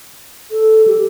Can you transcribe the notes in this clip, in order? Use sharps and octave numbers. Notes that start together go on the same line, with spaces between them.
A4
G4